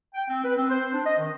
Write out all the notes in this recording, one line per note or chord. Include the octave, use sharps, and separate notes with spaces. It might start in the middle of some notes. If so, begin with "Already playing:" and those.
G5
C4
B4
C4
C5
D4
D#5
D#3